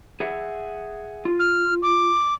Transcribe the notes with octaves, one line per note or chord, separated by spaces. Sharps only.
G#4 E5 F#5
F4
F6
D6